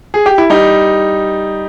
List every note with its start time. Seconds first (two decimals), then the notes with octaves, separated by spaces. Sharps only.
0.14 G#4
0.26 G4
0.38 E4
0.50 G3 D#4